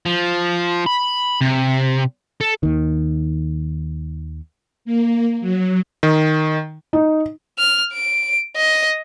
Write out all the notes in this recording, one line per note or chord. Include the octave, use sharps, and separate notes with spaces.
F3
B5
C3
A4
D#2 D#3
A#3
F#3
D#3
D#4
F6
D7
D#5